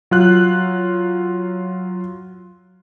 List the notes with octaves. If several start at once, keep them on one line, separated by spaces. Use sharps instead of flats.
F#3 F4 F#6